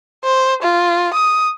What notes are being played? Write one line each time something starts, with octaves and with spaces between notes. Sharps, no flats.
C5
F4
D#6